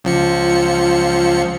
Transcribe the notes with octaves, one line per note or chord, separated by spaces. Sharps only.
C#2 F3 C#7